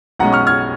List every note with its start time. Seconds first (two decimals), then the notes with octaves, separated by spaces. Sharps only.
0.19 B1 B2 G#3 C#4 F#5 A#5
0.33 C#6 F6
0.47 F6 G#6